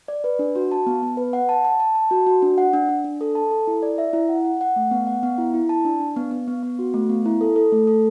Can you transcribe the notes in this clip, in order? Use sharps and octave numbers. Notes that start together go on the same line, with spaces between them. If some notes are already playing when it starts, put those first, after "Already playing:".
D5
B4
D4
F#4
A5
B3
B3
B4
F#5
A5
A5
A5
A5
F#4
F#4
D4
F#5
D4
D4
D4
A4
A5
A4
E4
D5
E5
E4
F#5
F#5
F#5
A3
B3
F#5
B3
E4
E4
A5
D4
D4
B3
B3
B3
B3
F#4
A3
B3
E4
A4
A4
A3
A4